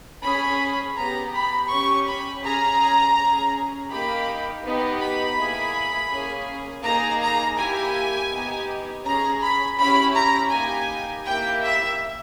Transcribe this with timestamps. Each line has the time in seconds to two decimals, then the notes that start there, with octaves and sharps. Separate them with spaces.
0.23 C#4 G#4 B5
0.96 B3 G4 A#5
1.32 B5
1.69 C#4 G4 C#6
2.07 B5
2.43 C#4 G#4 A#5
3.16 C#4 G#4
3.89 A#3 D#4 G4 B5
4.64 B3 D#4 G4
5.00 B5
5.37 A#3 E4 G#4
6.10 A#3 C#4 G#4
6.83 A#3 D#4 G#4 A#5
7.21 A#5
7.57 A#3 E4 G4 G#5
8.30 B3 D#4 G4
9.04 C#4 G#4 A#5
9.41 B5
9.77 C#4 E4 G4 B5
10.14 A#5
10.50 A#3 D#4 G4 G#5
11.24 A#3 E4 G4 G5
11.62 E5